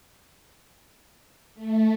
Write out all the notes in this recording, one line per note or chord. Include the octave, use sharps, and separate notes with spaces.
A3